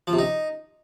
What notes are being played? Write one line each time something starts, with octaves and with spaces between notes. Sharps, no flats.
F3
C3
D#4